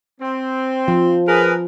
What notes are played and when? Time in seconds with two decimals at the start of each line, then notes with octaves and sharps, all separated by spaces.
0.21 C4
0.88 F3
1.27 G#4 A#4 B4